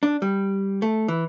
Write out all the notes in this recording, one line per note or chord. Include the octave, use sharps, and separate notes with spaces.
D4
G3
A3
E3